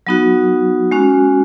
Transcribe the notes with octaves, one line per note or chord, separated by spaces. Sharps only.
F#3 B3 D#4 F#4
G#3 C#4 F#4